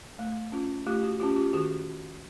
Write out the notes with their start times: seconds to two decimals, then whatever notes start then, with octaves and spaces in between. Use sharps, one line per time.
0.19 A3
0.52 C#4 F4
0.86 A3 F4 G4
1.03 F#4
1.20 C#4 F4 G4
1.36 F4 G4
1.53 D#3 F#4 G#4